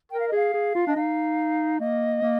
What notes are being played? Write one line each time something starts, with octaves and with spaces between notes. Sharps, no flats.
A#4 G5
F5
D#5
G#4 F5
G#4
F4
D4 D#5
D#4 F5
A#3 D#5
A#3